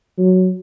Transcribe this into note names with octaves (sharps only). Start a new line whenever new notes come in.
F#3